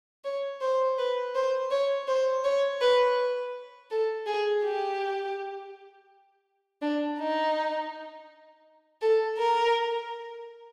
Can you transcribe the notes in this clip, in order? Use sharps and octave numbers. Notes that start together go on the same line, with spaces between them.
C#5
C5
B4
C5
C#5
C5
C#5
B4
A4
G#4
G4
D4
D#4
A4
A#4